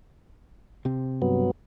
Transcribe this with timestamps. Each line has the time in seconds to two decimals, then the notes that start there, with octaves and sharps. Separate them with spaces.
0.85 C3 C4
1.22 G2 F#3 B3